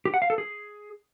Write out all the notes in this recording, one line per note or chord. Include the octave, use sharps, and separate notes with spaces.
G4
F#5
F5
A4
G#4